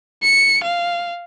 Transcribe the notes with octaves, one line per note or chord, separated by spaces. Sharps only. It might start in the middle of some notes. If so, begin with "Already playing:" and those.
C#7
F5